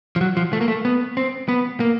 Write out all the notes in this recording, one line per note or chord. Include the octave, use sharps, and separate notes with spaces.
F3
F#3
F3
A3
A#3
A3
B3
C4
B3
A#3